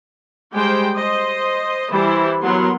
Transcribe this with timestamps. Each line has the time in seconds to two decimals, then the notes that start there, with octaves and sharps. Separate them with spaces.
0.54 G3 G#3 G4 C5 G5
0.97 C5 D#5
1.91 E3 G3 E4 C5
2.41 F#3 B3 A#4 C6